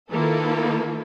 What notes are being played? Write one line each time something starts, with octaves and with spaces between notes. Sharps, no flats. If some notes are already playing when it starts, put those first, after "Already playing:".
D#3 A#3 E4 F4 A4 B4